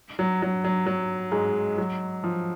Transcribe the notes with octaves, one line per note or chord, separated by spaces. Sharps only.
F#3
F#3
F#3
F#3
G#2 G#3
F#3
F3